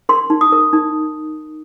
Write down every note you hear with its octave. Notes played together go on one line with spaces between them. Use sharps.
A#4 C6
D#4
D#6
A#4
D#4